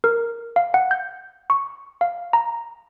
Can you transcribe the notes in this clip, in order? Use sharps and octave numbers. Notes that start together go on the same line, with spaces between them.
A#4
F5
F#5
G6
C#6
F5
A#5